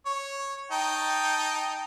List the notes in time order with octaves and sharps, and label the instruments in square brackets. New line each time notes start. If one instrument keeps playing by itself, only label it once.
[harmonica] C#5
D#4 G5 A5